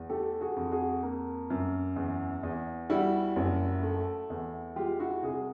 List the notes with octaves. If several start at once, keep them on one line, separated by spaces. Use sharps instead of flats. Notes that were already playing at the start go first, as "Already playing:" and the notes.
Already playing: E2
A3 G4 A4
F#4 G#4
F2
F#4 G#4
A#3
F#2
E2
E2
G3 E4 F#4
F#1
A3
E2
G#3 F4 G4
E4 F#4
C2 F#4 G#4